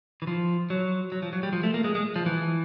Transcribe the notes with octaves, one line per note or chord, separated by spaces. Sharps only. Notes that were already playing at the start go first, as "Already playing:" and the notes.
E3
F3
F#3
F#3
F3
F#3
G3
F3
A3
A#3
G#3
G#3
F3
E3